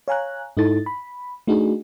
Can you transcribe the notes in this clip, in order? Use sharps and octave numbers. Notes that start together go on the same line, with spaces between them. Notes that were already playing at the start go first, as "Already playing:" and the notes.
C#5 F5 G#5 A#5 F#6
G#2 D#4 E4 A4 A6
B5
A3 D4 D#4 F#4 G#4